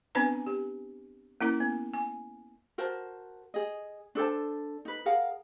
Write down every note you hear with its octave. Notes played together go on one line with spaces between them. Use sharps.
B3 C4 D4 B4 G#5 A#5
G4
A#3 C#4 E4 A#4 A#5
B3
G#5
F#4 A#4 C5 A5
G#4 D#5
D4 A4 C5 A5
D#4 B4
G#4 A#4 F5 F#5